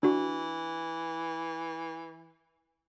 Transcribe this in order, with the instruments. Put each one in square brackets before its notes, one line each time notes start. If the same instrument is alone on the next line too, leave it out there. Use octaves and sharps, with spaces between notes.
[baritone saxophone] E3 [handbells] D4 F#4